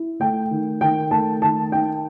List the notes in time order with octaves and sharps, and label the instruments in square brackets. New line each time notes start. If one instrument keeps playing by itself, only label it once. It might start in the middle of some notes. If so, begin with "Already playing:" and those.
Already playing: [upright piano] E4
A3 G5
D#3
D#3 G5
A3 A5
D#3 A5
D#4 G5